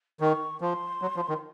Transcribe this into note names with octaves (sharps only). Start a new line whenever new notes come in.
D#3 C#6
F3 C6
F#3
F3
D#3